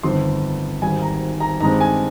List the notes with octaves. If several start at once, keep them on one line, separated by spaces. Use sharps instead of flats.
G1 F2 D#3 C6
G#1 G#2 G3 G#5
A#5
A#5
G2 D#3 G#3 C4 A#5
G#5